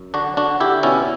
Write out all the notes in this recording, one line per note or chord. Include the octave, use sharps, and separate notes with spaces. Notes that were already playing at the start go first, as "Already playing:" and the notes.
Already playing: F#2
D3 D4 F#4
D3 D4 F#4
D3 E4 G4
B2 C#4 E4